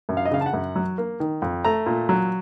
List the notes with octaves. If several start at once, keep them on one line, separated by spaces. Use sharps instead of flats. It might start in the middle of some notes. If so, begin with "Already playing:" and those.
F#2
F5
D#5
C#3 F5
A5
F#5
F#2
F#3
A#3
D#3
F2
A3 A#5
A#2
F#3